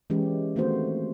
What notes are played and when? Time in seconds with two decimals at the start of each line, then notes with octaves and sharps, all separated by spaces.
0.10 E3 G#3 C#4 G4
0.56 D#3 A3 A#3 C4 F#4 C5